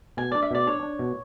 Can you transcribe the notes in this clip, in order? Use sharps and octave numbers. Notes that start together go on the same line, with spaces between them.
B2 G#5
D4 D5
E5
B2 D5
D4 C#5
D4
B2